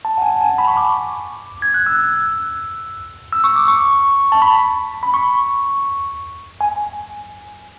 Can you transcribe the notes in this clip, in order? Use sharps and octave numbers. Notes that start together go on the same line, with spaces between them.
A5
F#5
G#5
G#5
A5
B5
C#6
D6
G#6
F#6
E6
E6
C#6
D6
C#6
A5
B5
B5
C#6
G#5